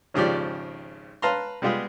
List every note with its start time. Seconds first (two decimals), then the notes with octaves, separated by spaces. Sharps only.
0.14 G#1 C#3 F3 G4 D5
1.22 B4 F5 A5 A#5 C6
1.62 G3 G#3 B3 F4 G4 G#4